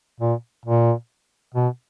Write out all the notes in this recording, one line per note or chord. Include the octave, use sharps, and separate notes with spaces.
A#2
A#2
B2